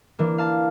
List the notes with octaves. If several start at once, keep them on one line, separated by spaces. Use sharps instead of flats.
E3 A#3 D4
F5 A5